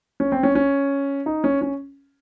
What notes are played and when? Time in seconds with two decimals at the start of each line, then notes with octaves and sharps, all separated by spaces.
0.20 C#4
0.32 C4
0.43 C#4
0.55 C#4
1.26 D#4
1.44 C#4
1.62 C#4